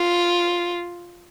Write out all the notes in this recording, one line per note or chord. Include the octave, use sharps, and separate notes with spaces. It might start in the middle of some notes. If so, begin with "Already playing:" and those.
Already playing: F4